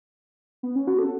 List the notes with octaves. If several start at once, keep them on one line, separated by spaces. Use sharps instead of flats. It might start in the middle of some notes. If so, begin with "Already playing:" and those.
B3
C#4
F#4
A4